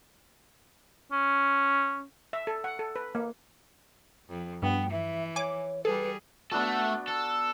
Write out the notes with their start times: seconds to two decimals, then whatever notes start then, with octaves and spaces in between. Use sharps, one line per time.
1.12 C#4
2.33 E5
2.47 A4
2.64 F#5
2.79 A4
2.96 B4
3.15 A#3
4.30 F2
4.62 G2 B3 G5
4.91 E3 E5
5.36 C#5 G#5 D6
5.85 G3 G#4 A4 B4
6.52 A3 B3 D4 F#4 A4
7.08 A4